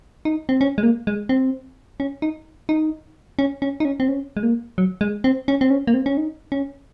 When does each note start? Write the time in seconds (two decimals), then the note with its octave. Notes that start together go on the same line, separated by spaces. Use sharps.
0.25 D#4
0.49 C4
0.61 C#4
0.78 G#3
0.83 A#3
1.07 G#3
1.29 C4
2.00 C#4
2.22 D#4
2.69 D#4
3.39 C#4
3.62 C#4
3.80 D#4
3.85 C#4
4.00 C4
4.09 C#4
4.37 G#3
4.43 A#3
4.78 F#3
5.01 G#3
5.24 C4
5.48 C#4
5.61 C4
5.70 C#4
5.87 A#3
5.94 C4
6.06 C#4
6.17 D#4
6.52 C#4